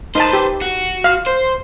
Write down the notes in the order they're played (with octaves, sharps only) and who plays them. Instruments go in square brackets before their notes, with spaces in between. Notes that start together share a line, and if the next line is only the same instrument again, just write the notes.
[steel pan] D#4 A5 [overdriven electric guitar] B4 C5
[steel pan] G4
[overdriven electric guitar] F#4
[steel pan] F5
[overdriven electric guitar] C5